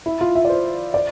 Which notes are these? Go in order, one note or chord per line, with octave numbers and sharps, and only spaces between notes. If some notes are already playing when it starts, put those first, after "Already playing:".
E4
F4
E5
D5
C5
D5